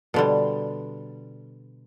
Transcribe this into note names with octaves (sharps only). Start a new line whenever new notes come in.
B2 D3 G3